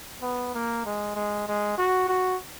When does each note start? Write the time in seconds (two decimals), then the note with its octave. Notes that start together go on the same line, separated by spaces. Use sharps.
0.23 B3
0.55 A#3
0.86 G#3
1.15 G#3
1.48 G#3
1.78 F#4
2.09 F#4